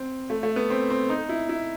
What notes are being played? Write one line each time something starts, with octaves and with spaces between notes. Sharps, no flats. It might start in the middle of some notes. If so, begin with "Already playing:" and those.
Already playing: C4
A3
A3
B3
C4
C4
D#4
E4
E4